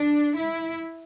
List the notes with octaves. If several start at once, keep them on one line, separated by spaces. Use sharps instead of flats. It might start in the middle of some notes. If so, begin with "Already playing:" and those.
Already playing: D4
E4